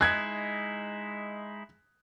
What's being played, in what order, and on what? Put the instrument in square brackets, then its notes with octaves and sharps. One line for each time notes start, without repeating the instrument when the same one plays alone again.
[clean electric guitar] G#3 D#4 E4 [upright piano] F#6 G#6